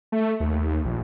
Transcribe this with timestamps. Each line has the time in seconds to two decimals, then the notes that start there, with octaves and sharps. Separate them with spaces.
0.12 A3
0.40 D#2
0.85 A#1